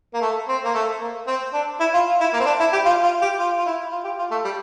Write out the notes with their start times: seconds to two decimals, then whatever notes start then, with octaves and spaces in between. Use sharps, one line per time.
0.14 A#3
0.21 A3
0.48 C4
0.65 A#3
0.74 A3
1.00 A#3
1.27 C4
1.53 D4
1.80 E4
1.94 F4
2.07 F4
2.20 E4
2.33 A#3
2.40 C4
2.46 D4
2.60 E4
2.73 G4
2.85 F4
3.03 F4
3.21 G4
3.39 F4
3.58 F4
3.66 E4
3.92 F4
4.04 G4
4.19 F4
4.31 A3
4.45 G3